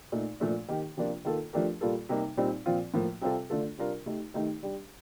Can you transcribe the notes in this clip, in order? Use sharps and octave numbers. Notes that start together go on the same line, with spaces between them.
A#2 A3 D#4
A#2 F3 A3 D4
D#3 A#3 D#4 G4
C3 F3 A#3 D4 F4
D#3 A#3 F4 A4
F3 A3 D4 G4 A#4
A#2 G3 A#3 F4 A4
C3 G3 A#3 D#4
A#2 G3 C4 D#4
A#2 F3 C4 F4
A2 F3 A#3
C3 G3 C4 F4 A4
D3 A3 D4 F4 A4
C3 G3 D4 F4 A#4
A3 D#4 G4
D#3 A3 D#4 G4
G3 D4 G4